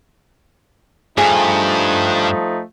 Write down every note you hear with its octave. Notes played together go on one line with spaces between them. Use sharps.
G2 F3 A3 D#4 G#4